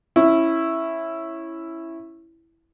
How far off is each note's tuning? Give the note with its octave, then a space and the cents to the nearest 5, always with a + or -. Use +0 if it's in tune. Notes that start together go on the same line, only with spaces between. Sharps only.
C#4 -15 E4 +0